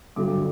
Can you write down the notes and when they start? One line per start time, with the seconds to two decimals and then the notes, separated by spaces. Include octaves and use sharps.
0.16 G1 G2 D3 F#3 D6